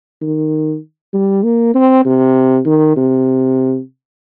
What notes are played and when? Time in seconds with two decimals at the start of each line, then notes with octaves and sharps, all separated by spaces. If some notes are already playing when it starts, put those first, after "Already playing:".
0.21 D#3
1.13 G3
1.43 A#3
1.74 C4
2.05 C3
2.66 D#3
2.97 C3